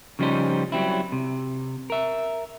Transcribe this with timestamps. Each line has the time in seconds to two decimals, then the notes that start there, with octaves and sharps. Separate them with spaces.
0.19 C#3 F3 G3 C#4 D#4 C5
0.72 F#3 G3 C4 E4
1.12 C3
1.90 A#4 E5